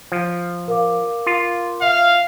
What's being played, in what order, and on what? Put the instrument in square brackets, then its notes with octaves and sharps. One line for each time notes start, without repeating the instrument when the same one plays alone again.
[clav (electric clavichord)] F3
[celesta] A#4 F5 D6
[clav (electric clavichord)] F4
[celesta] E5 [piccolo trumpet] F5